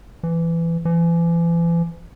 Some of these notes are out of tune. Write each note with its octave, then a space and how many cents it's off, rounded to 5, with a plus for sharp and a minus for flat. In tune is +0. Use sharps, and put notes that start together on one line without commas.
E3 +20
E3 +40